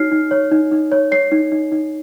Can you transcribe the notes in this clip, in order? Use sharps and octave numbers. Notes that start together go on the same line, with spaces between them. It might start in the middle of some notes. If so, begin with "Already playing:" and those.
Already playing: D#4 F#4 C#5 F6 C7
D#4
C#5
D#4
D#4
C#5
C#5 C7
D#4
D#4
D#4